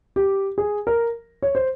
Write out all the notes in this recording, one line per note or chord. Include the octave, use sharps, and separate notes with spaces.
G4
G#4
A#4
C#5
C5